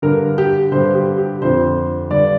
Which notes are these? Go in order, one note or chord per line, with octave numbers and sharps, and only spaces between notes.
G2 D3 A#4
G4
G2 D3 C5
G4
G4
F2 D3 C5
G2 D3 D5